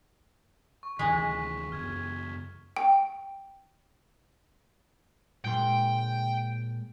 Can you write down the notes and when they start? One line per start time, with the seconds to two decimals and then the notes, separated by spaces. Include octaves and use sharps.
0.83 C#6
0.99 D2 C3 D#3 E3 G#3 G#4 B6
1.25 C#6
1.72 F#2 C#3 B3 F6 G#6
2.76 G5
5.45 A#2 G#3 G5 C6